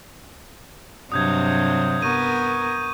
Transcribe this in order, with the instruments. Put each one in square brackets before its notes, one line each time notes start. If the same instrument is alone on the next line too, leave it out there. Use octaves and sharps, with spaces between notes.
[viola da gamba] G2 C3 F#3 [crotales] D#6 G6 G#6
[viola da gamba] B3 A#4 [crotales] C#6 G6 D#7